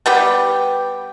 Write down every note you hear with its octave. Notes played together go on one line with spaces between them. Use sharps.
G3 B3 G4